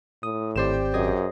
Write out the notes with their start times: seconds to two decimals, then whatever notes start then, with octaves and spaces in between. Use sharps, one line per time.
0.23 A2 D#6
0.56 G#1 C4 G4 C5 D5 E7
0.94 F#2 G#4 D#5